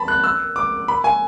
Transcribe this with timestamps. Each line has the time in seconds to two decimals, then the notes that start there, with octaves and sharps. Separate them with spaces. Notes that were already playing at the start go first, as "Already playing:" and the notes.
Already playing: A5 B5
0.08 F#6
0.24 E6
0.56 D6
0.88 B5
1.04 G#5